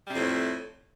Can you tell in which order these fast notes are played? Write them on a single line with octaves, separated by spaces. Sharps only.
G3 C3 F2 A2